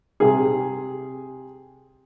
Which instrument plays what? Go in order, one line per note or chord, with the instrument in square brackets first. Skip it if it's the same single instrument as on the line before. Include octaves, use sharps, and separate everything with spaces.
[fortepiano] C3 G#4